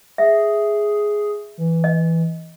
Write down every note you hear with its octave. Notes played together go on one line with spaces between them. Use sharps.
G#4 E5
E3
D#5